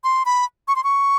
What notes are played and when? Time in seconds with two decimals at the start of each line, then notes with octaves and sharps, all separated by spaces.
0.04 C6
0.25 B5
0.68 C#6
0.76 C6
0.84 C#6